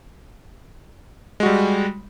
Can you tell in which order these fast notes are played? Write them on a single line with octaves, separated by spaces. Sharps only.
G#3 F#4 G3